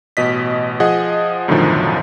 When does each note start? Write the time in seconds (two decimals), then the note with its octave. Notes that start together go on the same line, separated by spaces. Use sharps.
0.17 A1 B2 D#5 B6
0.80 F3 G#4 D#5 F#5
1.48 B1 F#2 A2 D3 D#3 F3